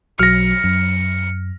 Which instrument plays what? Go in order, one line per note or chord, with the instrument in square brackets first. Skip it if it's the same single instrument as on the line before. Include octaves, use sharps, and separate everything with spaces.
[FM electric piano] B1 F#3 [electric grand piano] F6 A#6 [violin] C#7
[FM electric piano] F#2